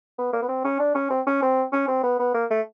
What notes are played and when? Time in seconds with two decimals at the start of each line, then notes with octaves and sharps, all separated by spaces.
0.19 B3
0.33 A#3
0.42 B3
0.49 C4
0.65 C#4
0.79 D4
0.95 C#4
1.10 C4
1.27 C#4
1.42 C4
1.73 C#4
1.88 C4
2.04 B3
2.20 B3
2.34 A#3
2.51 A3